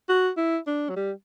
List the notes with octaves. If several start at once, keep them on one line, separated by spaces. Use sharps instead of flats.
F#4
E4
D4
F#3
G3